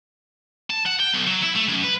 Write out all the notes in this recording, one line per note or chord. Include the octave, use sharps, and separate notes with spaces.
A5
F#5
G5
B1
F#3
E4
A3
F#2
B4